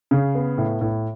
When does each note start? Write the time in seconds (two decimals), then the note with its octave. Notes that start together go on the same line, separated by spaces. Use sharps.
0.11 C#3
0.35 B3
0.58 A2
0.81 A2